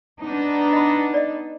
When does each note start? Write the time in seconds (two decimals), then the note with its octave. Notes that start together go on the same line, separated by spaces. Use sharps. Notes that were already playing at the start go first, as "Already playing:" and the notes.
0.21 B3 D4 D#4
0.73 D#5 B5
1.14 D5 D#5